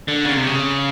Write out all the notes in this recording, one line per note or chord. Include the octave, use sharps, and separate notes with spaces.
D3
C#3
C3
C#3